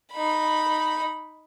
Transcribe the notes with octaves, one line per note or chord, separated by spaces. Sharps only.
D#4 B5